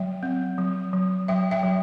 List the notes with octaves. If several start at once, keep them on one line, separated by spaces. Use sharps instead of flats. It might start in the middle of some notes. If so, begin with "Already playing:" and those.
Already playing: F#3 E5 G5
C4
F#3
F#3
F#3 E5 G5
E5 G5
F#3